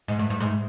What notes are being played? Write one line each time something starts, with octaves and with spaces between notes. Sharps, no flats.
G#2
G2
G2
G#2